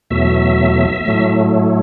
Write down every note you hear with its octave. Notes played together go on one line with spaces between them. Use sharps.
E2 B2 F#3 A3 E5
A2 F#3 A3